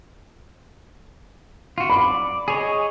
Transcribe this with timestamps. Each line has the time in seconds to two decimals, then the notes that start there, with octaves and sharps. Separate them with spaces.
1.78 F4 F#4
1.90 D5 B5
2.48 G#4 C#5 D#5